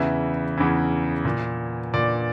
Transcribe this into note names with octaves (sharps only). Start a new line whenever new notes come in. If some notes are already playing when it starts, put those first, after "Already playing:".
Already playing: E2 C#3 E3 E5
E2 C#3 E3
A#2
A#2 D5